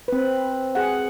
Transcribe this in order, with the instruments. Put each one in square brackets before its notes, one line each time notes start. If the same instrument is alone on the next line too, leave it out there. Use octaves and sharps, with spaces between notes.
[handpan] C4 B4
G#4 F#5